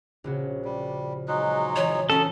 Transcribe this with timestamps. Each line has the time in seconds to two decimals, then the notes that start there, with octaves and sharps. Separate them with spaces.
0.24 A#1 C#3 F#4
0.65 G3
1.28 F#3 G#3 D#4 F#6
1.76 E3 C#5
2.10 C#4 F#4 G#4 A4